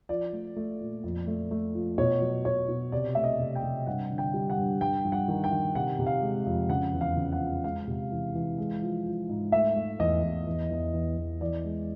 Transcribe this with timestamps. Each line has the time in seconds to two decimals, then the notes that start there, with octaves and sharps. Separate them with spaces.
0.09 F3 D5
0.33 A3
0.56 A3
0.80 A#2
1.04 F2
1.27 A3
1.51 A3
1.74 F3
1.98 B2 C#5
2.21 F#3
2.45 B2 C#5
2.69 B2
2.92 C3 D5
3.15 A3 E5
3.24 D#5
3.39 C3
3.55 G5
3.63 C3
3.87 G2 F#5
4.11 D3
4.18 G5
4.34 G3
4.50 F#5
4.57 G2
4.81 G2 G5
5.04 G2
5.12 F#5
5.28 D#3
5.44 G5
5.51 D#3
5.75 C3 F#5
5.99 C3
6.07 F5
6.22 G#3
6.46 F2
6.69 C#3 F#5
6.93 E2
7.01 F5
7.17 C#3
7.32 F#5
7.40 F3
7.64 G#3 F5
7.87 C3
8.11 E3
8.35 E3
8.58 G#3
8.82 F3
9.06 F3
9.29 G#2
9.52 A3 E5
9.76 A3
9.99 E2 D#5
10.23 E2
10.47 E2
10.71 E2
10.94 E2
11.18 E2
11.41 E3 D5
11.65 G#3